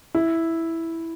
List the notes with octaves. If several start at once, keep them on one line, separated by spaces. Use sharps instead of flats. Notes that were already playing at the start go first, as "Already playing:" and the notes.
E4